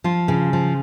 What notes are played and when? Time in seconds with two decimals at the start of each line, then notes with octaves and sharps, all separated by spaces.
0.04 F3 F4
0.28 C#3
0.53 F3